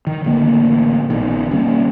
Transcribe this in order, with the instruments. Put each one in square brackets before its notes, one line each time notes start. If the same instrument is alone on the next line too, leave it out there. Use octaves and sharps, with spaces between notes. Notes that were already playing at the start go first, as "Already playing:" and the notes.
[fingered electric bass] D#3
A1 D3 A#3
A#1 B2 D#3
D#3 G3 A#3 C#4